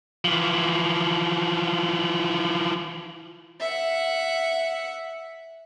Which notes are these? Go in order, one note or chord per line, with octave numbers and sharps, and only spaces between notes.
E3 F3
E5 F#5